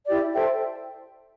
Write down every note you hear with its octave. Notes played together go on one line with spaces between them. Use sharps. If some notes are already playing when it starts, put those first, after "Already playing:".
E4 G4 D5
A4 C5 E5 G5